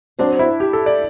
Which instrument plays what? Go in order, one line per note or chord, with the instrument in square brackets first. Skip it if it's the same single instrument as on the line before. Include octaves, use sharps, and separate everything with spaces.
[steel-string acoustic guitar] F#3 C4 F#4 C5 [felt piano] D4
[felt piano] E4
G4
A4
D5